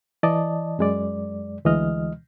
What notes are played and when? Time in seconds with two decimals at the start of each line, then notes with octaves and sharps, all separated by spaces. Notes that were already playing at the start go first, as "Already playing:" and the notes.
0.23 E3 D5 D#5 A5
0.79 F#2 G#3 D5
1.65 D2 E3 G#3 D#5 F6